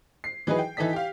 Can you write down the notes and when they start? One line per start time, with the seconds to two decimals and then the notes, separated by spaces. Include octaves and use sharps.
0.24 C7
0.47 E3 F#3 D#4 G#4 B4
0.59 G5
0.77 E3 D#4 A4 D#5 B6
0.93 G4 F5